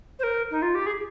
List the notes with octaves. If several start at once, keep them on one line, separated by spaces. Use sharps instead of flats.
C5
A#4
D#4
F4
G4
G#4